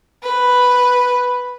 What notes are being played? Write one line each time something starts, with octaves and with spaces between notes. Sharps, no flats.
B4